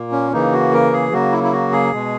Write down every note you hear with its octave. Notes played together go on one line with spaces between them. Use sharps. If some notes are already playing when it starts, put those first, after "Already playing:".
Already playing: A#2 A#3
C#4
C#3 E3 A#3 D#4
F#4
A#4
G#4
C#3 F#3 A#3 F#4
E4
E4
F#4
G#4
B2 G#3